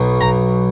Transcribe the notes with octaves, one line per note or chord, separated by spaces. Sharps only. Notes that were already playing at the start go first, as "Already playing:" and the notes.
Already playing: B1 B2
A#5